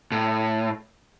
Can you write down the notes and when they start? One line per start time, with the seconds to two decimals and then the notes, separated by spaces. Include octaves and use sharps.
0.12 A2